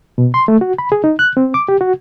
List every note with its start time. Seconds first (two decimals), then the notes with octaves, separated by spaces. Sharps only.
0.18 B2
0.34 C6
0.48 A3
0.61 F#4
0.78 B5
0.92 G#4
1.04 D#4
1.19 F#6
1.37 C4
1.54 D6
1.68 G4
1.81 F#4